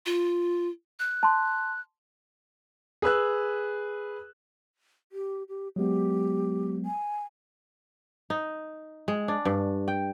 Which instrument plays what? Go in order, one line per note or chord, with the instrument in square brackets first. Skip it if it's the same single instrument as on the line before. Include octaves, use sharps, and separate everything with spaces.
[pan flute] F4
F#6
[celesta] A5 C6
[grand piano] G#4 B4 E6 F#6
[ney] G4
G4
[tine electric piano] F#3 G#3 B3 [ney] G4
[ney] G#5
[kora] D#4
G#3
D4
G2
G5